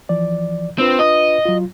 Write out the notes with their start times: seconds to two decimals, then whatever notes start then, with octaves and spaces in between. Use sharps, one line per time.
0.09 E3 F3 D5
0.80 C4 D4 F4 B4
1.00 D#5
1.46 F#3 F4